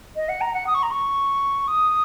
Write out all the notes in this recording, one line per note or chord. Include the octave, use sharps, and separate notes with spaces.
D#5
F#5
A#5
F#5
D#6
C#6
A#5
C#6
D#6